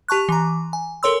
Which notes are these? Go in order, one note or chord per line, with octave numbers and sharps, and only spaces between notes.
G4 A5 C#6 F#6
E3 A#5
G#5
A4 A#4 C#5 C6 E6